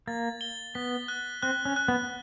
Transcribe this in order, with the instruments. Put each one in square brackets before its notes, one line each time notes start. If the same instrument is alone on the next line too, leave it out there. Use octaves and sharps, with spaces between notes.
[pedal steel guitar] A#3 [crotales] A6
[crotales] G7
[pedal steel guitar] B3 [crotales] B6
[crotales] F#6
[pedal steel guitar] C4 [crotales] F#6
[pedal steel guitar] C#4
[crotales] F#6
[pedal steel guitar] B3